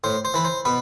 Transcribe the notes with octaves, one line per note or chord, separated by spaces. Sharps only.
A2 C5
C5
E3 B4
C5
B2 B4